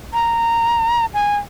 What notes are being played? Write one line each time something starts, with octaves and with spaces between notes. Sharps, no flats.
A#5
G#5